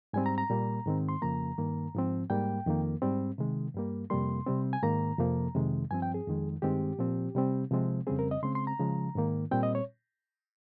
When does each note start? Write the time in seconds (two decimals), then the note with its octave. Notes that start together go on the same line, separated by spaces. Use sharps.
0.13 G#2 G3 C4 G#5
0.26 A#5
0.38 A#5
0.50 A#2 G3 A#3
0.86 G#2 D#3 G#3 C4
1.09 C6
1.22 F2 C#3 F3 A#3 A#5
1.58 G2 D#3 A#3
1.94 G#2 F3 C4
2.30 G#2 G3 A#3 G5
2.66 F2 D#3 A#3
3.02 G#2 G3 C4
3.38 C3 D#3 G#3
3.74 G2 G3 A#3
4.10 F2 C3 G3 A#3 C6
4.47 C3 G3 C4
4.73 G#5
4.82 G#2 D#3 A#3 A#5
5.18 F2 C3 F3 A#3
5.55 F2 C3 D#3 G#3
5.91 G2 F3 C4 G#5
6.02 G5
6.14 G#4
6.27 F2 D#3 G#3
6.62 G2 D#3 G#3 C4 G4
6.99 A#2 F3 C4
7.35 C3 G3 C4
7.71 C3 F3 G#3 C4
8.07 F2 C#3 G3 C4 G#4
8.19 A#4
8.31 D#5
8.43 C#3 G#3 C4 C6
8.55 C6
8.67 A#5
8.80 C#3 F3 G#3
9.15 G#2 D#3 A#3
9.51 A#2 G3 C4 G5
9.63 D#5
9.75 C#5